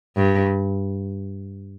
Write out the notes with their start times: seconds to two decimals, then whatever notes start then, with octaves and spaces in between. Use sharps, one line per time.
0.17 G2